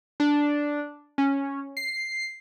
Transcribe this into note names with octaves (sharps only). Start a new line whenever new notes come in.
D4
C#4
C7